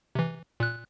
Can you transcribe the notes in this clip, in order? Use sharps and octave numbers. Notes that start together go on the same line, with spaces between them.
C3 E3
A#2 F#6